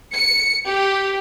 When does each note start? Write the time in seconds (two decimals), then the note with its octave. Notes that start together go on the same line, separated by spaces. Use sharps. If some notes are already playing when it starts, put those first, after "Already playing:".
0.13 C#7
0.67 G4